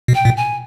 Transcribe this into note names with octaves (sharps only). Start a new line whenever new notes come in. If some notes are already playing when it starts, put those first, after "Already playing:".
B2
G5
A#2
G#5